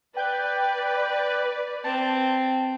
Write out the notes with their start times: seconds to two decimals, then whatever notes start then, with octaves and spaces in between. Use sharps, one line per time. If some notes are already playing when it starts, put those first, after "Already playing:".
0.16 B4 D5 G5 F#6 G6
1.84 C4 A5